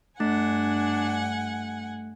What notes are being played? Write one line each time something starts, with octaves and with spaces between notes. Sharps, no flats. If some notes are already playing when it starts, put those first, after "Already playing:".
G2 A3 D4 F#5 G#5